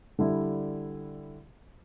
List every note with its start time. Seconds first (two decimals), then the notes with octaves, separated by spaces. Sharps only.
0.19 D3 G3 E4